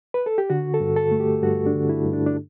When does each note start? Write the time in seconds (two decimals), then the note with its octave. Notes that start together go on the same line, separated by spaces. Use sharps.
0.14 B4
0.26 A4
0.38 G4
0.50 D3 F#4
0.74 A4
0.80 G2
0.96 A4
1.11 A3
1.20 G4
1.42 G2 F#4
1.66 D4
1.74 D3
1.89 E4
2.05 G2
2.13 D4
2.26 D4